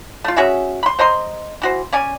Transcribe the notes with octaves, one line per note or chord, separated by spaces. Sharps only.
A3 F4
C#4 F#4 G#4 E5
B5 C6
C5 D#5 A#5 C6
E3 F#4 C5
C#4 C#5 D5 G#5